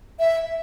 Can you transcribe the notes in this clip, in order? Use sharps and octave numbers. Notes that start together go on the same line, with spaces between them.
E5